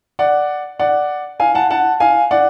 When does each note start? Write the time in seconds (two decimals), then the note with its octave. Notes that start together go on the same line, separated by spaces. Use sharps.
0.19 D5 F#5
0.79 D5 F#5
1.40 F5 G#5
1.55 F#5 A5
1.70 F#5 A5
2.00 F5 G#5
2.31 D5 F#5